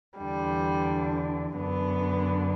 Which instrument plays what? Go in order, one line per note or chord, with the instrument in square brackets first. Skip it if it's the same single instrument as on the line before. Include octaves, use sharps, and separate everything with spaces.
[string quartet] E2 D3 G3
F#2 D3 B3